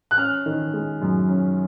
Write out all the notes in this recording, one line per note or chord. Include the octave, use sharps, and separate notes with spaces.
F#6
C#4 F6
D#3
G#3
F#2
C#4